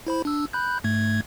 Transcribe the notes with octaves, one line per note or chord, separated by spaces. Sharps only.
E4 C5 B5
D4 E6
B5 F#6 G6
G#2 A3 G#6